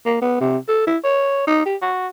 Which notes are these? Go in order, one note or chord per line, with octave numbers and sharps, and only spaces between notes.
A#3
B3
C3
A4
E4
C#5
D#4
G4
F#4